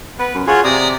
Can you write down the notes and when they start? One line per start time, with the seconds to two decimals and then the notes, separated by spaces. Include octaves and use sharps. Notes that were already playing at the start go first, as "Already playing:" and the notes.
0.19 B3 B4
0.34 F#2
0.47 F4 F#4 G#4 C#5
0.64 C3 D5 A#5 D#6